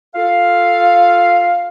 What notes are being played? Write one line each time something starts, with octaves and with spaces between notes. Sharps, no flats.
F4 A4 F5